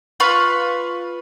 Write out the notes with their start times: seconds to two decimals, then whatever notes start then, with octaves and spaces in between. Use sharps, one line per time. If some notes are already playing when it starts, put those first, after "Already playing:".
0.20 F4 B4 B5 C#6